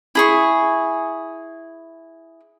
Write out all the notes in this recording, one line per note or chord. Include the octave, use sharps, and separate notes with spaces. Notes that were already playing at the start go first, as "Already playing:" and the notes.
E4 G#4 C#6